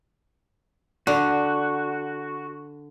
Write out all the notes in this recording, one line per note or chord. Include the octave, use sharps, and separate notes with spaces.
D3 F#4